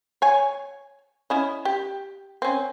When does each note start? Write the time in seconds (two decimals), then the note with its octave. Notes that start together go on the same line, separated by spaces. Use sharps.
0.22 C#5 G#5
1.30 C#4 E4 D#5
1.65 G4
2.42 C4 C#4